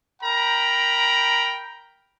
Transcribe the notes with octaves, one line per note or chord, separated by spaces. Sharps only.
A#4 G5 A#5 B5